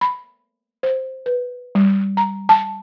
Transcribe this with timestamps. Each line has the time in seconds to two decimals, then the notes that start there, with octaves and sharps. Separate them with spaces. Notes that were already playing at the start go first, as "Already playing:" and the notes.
0.01 B5
0.83 C5
1.26 B4
1.75 G3
2.17 A#5
2.49 A5